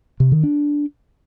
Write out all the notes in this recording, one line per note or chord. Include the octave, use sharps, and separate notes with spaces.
C3
D#3
D4